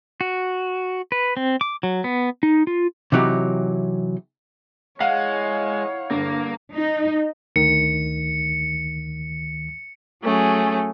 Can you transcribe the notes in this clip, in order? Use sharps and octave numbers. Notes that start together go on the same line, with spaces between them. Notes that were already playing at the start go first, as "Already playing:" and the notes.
F#4
B4
C4
D6
F#3
B3
D#4
F4
C3 E3 F#3 D#4 G4
G#3 E4 C#5 F5 F#5
G2 D3 A#3
D#4
D2 D#3 C#7
F#3 A3 C#4 G#4